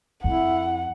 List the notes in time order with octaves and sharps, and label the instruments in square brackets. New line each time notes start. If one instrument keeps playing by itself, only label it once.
[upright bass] F2 [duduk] E4 [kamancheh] F#5